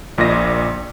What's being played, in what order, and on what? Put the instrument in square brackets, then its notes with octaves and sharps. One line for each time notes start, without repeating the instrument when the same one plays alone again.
[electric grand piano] A#1 A#2 D#5 A#6